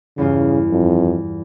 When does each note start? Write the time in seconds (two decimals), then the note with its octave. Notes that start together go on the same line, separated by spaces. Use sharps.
0.18 E2 G2 C#3 F4
0.71 F2